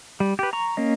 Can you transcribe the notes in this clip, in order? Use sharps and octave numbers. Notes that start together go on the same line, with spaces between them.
G3
G4 B4
A#5 C#6
A#3 C#4 D#5